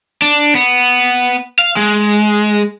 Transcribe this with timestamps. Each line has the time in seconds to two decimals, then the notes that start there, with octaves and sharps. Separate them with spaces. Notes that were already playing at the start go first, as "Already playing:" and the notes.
0.22 D4
0.55 B3
1.59 F5
1.77 G#3